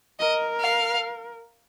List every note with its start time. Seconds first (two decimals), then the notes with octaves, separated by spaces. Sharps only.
0.19 A#4 D#5
0.60 F5